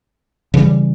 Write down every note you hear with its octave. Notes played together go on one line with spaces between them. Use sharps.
C#3 E3 G3